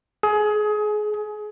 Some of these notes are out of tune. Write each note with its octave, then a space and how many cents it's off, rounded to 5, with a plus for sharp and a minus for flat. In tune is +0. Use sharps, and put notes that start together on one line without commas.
G#4 +25